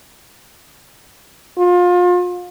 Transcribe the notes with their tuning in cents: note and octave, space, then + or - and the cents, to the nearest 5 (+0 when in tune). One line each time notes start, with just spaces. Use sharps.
F4 +30